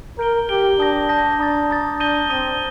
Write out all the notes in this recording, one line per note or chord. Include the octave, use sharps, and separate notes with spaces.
A#4 G6 D7 G7
G4 G6 D7 G7
D4 A5 D#6 G6 A#6
A5 D#6 G6 A#6
D4 A#5 D#6 A6
A#5 D#6 A6
D4 D#6 G6 A#6 D#7 G7
C4 D#6 G6 A#6 D#7 G7